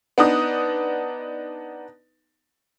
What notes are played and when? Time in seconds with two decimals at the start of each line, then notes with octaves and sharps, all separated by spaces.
0.18 B3 D4 D#4 D#6